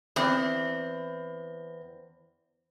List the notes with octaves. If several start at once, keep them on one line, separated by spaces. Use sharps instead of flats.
E2 C4